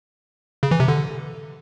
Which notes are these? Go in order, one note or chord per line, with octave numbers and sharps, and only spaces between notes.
C#3
E3
C3
D3